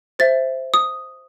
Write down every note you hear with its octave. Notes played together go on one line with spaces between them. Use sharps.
C5 E5 A6
D#6